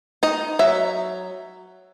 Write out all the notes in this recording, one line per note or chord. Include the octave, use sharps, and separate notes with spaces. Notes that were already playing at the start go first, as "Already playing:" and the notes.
D#4 D#5
F#3 E5